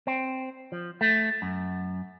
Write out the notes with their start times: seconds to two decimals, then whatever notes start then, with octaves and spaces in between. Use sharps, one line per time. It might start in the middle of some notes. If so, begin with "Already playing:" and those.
0.07 C4
0.72 F3
1.01 A3
1.42 F#2